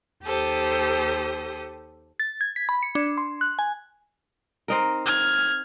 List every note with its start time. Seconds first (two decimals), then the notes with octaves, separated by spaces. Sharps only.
0.23 D#2 G4 A4 C5 D#6
2.20 A6
2.41 G#6
2.56 B6
2.69 B5
2.83 C#7
2.95 D4
3.18 C6
3.41 F#6
3.59 G#5
4.68 C4 D#4 A#4
5.06 F6 G#6